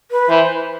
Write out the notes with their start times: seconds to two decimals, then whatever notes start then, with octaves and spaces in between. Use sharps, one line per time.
0.11 B4
0.29 E3 C5